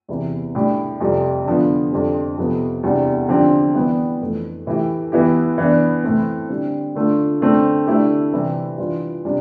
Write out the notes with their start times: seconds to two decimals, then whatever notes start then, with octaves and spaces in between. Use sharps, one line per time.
0.08 E2 C3 E3
0.55 A2 G3 D4 G4
1.00 F2 C3 G3
1.46 D3 F3 B3
1.91 F2 D3 G3 C4 G4
2.38 F2 C3 F3 B3
2.83 E2 C3 G3 D4
3.28 D3 F3 C4 G4
3.75 E3 G3 B3 D4 G4
4.21 F2 E3 A3
4.67 A2 E3 A3 E4 G4
5.12 E3 B3 E4 G4
5.58 E3 B3 D4
6.03 A2 E3 A3 C4
6.49 D3 G3 C4
6.95 D3 A3 D4 F4
7.41 D3 A3 C4
7.87 D3 A3 E4 G4
8.33 C3 E3 G3 C4
8.78 E3 G3 D4 F4
9.25 C3 G3 D4